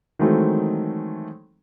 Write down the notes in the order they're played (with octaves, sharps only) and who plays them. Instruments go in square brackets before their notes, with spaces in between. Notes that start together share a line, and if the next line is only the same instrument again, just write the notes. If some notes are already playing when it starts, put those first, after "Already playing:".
[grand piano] D#3 E3 F#3 G#3 A3 C4